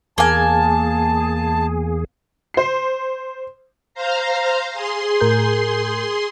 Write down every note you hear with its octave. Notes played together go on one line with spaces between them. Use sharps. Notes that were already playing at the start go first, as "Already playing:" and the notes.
E2 A#3 G#4 G#5 A5
C5 C7
C5 F5 A#5
G#4 C6
A2 A#4 G6